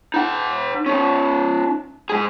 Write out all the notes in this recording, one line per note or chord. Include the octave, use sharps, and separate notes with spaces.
D#4 F#5
C#4 D#4
G#2 G#4